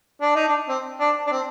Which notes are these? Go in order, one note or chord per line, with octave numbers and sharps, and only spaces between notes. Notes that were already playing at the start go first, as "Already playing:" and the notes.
D4
D#4
D4
C4
D4
D4
C4